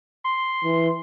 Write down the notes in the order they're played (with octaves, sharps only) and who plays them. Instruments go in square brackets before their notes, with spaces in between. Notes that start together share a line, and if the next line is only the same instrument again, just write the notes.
[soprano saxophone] C6
[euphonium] E3